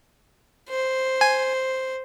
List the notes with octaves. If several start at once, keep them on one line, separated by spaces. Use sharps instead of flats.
C5
G#5